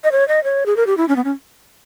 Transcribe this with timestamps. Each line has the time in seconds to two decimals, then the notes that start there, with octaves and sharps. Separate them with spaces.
0.04 D#5
0.12 C#5
0.28 D#5
0.44 C#5
0.66 G#4
0.76 A#4
0.87 G4
0.97 E4
1.09 C#4
1.16 B3
1.24 C#4